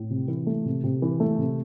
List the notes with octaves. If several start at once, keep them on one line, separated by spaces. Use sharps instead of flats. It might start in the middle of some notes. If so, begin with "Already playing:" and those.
Already playing: A2
C3
E3
A3
C3
C3
E3
A3
C3